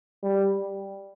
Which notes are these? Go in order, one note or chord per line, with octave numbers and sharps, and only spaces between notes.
G3